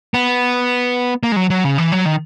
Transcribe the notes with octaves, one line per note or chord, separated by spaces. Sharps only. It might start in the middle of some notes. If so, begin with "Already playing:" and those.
B3
A#3
G#3
F#3
F#3
C#3
E3
F#3
D#3